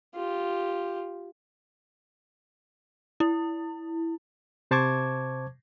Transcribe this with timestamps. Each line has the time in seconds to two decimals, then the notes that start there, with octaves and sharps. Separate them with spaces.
0.15 F4 G4
3.20 E4
4.71 C3 C5 A5 C#6 D6 G#6